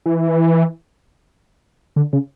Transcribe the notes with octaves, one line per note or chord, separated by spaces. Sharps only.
E3
D3
C#3